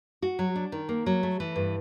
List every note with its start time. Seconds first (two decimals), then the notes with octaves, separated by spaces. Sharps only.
0.22 F#4
0.39 F#3
0.56 D4
0.72 D#3
0.89 A#3
1.06 F#3
1.23 A3
1.40 E3
1.56 G2